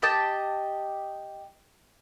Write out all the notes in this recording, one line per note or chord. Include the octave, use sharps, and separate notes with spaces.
G4 D#5 G5 A5